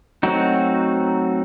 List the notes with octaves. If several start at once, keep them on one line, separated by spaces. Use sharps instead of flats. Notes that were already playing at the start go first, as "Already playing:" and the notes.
F#3 A3 C4 D#4 F#4